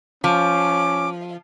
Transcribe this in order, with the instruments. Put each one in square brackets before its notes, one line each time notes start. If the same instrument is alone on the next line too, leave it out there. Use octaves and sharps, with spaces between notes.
[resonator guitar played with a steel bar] F3 [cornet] C#4 [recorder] D6